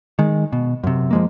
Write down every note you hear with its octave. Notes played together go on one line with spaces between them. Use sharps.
D#3 G#3
B2
F#2 C3
F3 G#3 A#3